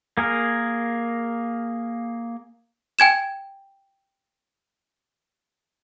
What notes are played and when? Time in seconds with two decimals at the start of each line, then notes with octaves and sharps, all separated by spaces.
0.17 A#3 G#4 A#4
2.99 G5 G#5 G#6 E7